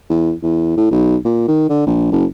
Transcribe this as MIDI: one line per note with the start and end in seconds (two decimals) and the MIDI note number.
0.10 0.32 40
0.43 0.76 40
0.77 0.88 45
0.91 1.16 35
1.25 1.45 46
1.48 1.67 51
1.69 1.84 50
1.86 2.11 34
2.11 2.25 30